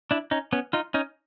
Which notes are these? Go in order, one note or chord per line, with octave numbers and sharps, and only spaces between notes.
D4 E4
C#4 D#4
B3 C#4
D#4 F4
C#4 D#4